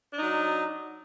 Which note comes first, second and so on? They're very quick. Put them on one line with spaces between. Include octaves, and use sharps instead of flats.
D4 D#4 F#3